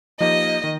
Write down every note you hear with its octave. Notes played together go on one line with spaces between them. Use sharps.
F3 A#3 D#4 G4 D#5
D#3